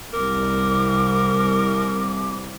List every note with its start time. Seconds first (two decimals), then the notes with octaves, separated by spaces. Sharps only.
0.14 C2 A#4 D6